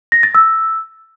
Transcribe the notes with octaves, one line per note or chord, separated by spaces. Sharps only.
A#6
A6
E6